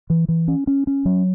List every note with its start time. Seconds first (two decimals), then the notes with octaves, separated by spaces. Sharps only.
0.10 E3
0.28 E3
0.48 C#4
0.67 C#4
0.87 C#4
1.05 F#3